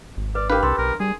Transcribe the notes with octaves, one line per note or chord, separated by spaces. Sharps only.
G#1
B4 D5
D4 G4 A#4 B4 F5
C2 A4 C6
B1 A#4
G3 G#4